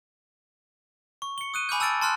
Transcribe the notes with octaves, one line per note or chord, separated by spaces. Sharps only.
C#6
C#7 G7
D#6 F#6 D#7
G#5 B5 D6 F6 G6
A5 E6 F6 A6 D7
A5 C6 F6 F#6